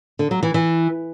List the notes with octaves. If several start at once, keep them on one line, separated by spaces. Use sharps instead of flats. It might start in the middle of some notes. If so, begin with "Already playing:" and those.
D3
F#3
E3
E3